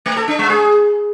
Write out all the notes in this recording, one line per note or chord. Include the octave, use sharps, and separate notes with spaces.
A3
A4
D4
G#3
G#4